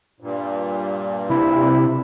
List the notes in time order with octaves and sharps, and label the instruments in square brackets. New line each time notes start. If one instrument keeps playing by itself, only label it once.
[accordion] G2 A#2
[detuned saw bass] C3 [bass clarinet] E4